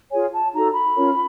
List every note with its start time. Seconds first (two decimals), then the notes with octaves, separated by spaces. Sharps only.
0.11 F4 G#4 C#5 G#5
0.33 A5
0.53 D#4 F#4 A4 A#5
0.74 B5
0.95 C#4 F4 A#4 C#5